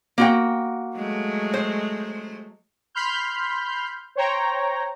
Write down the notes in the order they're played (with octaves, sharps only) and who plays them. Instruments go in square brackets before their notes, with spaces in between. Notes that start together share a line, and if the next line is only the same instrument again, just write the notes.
[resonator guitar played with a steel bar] A#3 F#4 G5
[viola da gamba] F#3 G#3 A3
[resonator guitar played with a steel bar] C5
[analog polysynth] B5 C6 F6 G6
C5 C#5 G5 A#5